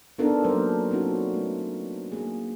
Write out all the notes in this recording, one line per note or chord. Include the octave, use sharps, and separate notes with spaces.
B3 D4 D#4 F4 A4 A#4
F#3 A#3 A#4 C5
C4 C#4 D#4 F4 F#4
A3
A#3 G#4